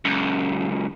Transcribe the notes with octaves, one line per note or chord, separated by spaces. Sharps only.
C#2 F#2